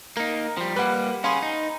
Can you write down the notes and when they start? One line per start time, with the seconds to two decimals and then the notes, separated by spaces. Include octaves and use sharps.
0.17 A#3 D#4 A#4
0.57 F3 G3
0.76 G3 A#3 B4 F#5
1.24 C#4 G#4 F5 B5 C6
1.42 D#4